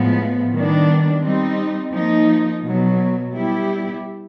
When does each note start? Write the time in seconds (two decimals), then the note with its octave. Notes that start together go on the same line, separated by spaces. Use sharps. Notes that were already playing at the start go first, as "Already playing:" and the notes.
Already playing: A2 F3 G#3 B3
0.54 D#3 G3 B3 D4
1.23 G3 C4 D#4
1.93 F3 A#3 D#4
2.64 B2 F#3 B3
3.34 G3 B3 E4 G4